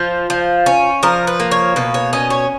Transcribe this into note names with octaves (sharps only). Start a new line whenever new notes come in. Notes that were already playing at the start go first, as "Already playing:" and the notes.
Already playing: F3 F4
F3
C#4
F3 A#4
B4
A#3
C#5
B2 B4
C#5
C#4 D#5
C#5